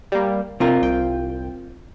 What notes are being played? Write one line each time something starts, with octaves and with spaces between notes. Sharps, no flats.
G3 A#3
C3 C4 F4 A#4
C2 G5